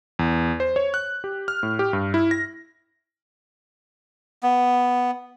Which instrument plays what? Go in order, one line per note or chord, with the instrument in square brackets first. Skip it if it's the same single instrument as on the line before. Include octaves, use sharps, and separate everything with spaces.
[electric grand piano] E2
C5
C#5
F#6
G4
F6
A2
G4
G2
E4
A#6
[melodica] B3